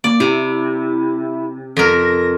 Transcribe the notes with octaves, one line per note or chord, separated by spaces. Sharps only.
A#3 D5
C3 E4
F2 A#4 A#6